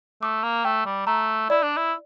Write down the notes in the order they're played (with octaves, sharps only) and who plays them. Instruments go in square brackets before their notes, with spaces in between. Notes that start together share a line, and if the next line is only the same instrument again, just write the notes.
[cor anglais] A3 [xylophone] D6
[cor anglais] A#3
[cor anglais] A3 [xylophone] G5
[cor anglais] G3
[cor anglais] A3 [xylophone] A#5
[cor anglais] E4 [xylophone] D5
[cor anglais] D4
E4